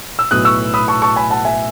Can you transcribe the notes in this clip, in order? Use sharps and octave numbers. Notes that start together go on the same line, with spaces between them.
E6
B1 A2 F#3 B3 D#6 F#6
C#6 E6
B5 D#6
A5 C#6
A5 C#6
G#5 B5
F#5 A5
E5 G#5